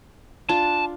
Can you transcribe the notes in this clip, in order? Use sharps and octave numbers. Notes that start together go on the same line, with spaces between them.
D4 F4 A5